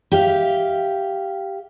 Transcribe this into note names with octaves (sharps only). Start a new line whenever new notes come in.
G4 E5 F5